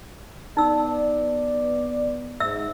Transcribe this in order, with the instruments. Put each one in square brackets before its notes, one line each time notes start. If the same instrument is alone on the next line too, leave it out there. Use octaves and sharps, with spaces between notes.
[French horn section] B3 D5 [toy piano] D#4 E6
[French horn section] G#2 [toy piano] E5 E6